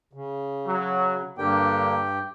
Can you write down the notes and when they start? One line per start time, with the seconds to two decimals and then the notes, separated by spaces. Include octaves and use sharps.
0.13 C#3
0.67 F#3
1.38 G2 D3 A#3 G4 G5